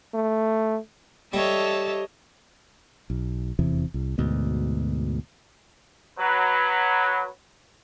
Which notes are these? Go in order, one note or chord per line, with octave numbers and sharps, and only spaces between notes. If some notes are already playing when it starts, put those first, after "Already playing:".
A3
G3 A4 C#5 D#5 E5 A5
B1
F1 E2 C3 E3
C2
D2 G#2 B2
F#3 B4